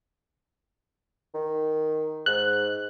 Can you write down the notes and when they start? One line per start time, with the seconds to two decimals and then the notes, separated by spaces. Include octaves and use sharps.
1.34 D#3
2.26 G#2 F#6